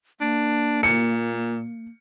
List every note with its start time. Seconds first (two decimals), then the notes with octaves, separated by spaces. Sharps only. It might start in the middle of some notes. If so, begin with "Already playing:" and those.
0.20 A#3 D4
0.83 A#2 C#7